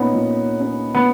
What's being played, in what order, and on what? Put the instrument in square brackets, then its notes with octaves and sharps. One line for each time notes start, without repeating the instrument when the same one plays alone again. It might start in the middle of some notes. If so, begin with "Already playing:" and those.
Already playing: [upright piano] A#2 C#4 [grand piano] B3 D#4
[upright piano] A#2
C#4
[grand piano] B3